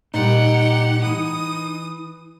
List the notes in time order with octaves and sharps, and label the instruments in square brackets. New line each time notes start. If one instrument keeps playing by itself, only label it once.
[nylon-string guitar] A#2 G3 [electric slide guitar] D#4 [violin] G4 F#5
[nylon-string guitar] E3 [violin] D#6